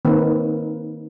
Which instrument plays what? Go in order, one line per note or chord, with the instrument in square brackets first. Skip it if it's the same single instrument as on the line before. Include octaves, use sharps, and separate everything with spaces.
[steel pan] D#3 A#3 C4 D#4 B4